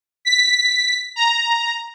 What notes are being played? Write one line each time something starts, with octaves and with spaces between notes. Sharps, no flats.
B6
A#5